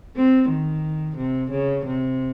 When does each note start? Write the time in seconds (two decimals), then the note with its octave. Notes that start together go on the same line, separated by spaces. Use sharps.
0.16 C4
0.50 D#3
1.17 C3
1.51 C#3
1.85 C3